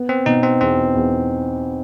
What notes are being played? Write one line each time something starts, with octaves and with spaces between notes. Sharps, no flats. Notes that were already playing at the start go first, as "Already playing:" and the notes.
Already playing: B3
C4
B2 D#4
C4
E2 C4
E2